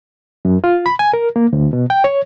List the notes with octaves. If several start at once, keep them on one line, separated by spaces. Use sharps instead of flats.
F#2
F4
B5
G#5
A#4
A#3
D2
B2
G5
C#5